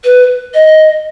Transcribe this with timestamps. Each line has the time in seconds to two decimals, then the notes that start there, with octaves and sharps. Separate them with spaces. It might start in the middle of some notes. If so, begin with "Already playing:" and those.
0.04 B4
0.54 D#5